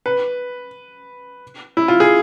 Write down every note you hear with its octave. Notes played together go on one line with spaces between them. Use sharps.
B4
E4
F4
G#4